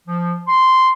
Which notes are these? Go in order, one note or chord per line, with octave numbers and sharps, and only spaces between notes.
F3
C6